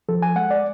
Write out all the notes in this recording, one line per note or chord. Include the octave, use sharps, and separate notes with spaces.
F3 A4
G#5
G#3 F#5
D5